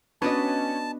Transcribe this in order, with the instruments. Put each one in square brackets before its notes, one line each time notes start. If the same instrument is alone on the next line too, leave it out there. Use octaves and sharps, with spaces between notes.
[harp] B3 D4 D#5 [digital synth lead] C#4 [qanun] F#4 B4 [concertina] A5